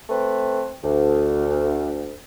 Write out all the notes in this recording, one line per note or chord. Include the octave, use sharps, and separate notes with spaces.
A3 C4 B4
D2